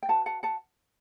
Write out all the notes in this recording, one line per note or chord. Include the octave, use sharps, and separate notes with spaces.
G5
F#4 B4 F#5 A5
F#5 A5
F#5 A5